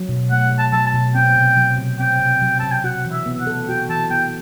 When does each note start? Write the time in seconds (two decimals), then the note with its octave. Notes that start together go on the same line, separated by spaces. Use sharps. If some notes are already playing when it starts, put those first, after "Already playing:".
Already playing: F#3
0.09 B2
0.31 A3 F#5
0.52 B2
0.59 A5
0.73 F#3 A5
0.86 A5
0.94 B2
1.15 C4 G5
1.35 C3
1.57 F#3
1.78 C3
1.99 C4 G5
2.20 C3
2.42 F#3
2.59 C3 A5
2.71 G5
2.84 F#4 F#5
3.05 E3
3.12 E5
3.26 B3
3.40 F#5
3.47 A4
3.68 F#4 G5
3.89 E3 A5
4.10 B3 G5